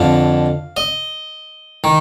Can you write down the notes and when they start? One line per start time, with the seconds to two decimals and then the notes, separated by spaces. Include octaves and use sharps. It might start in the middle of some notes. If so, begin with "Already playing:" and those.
Already playing: F2 D3 F5
0.77 D#5
1.84 D#3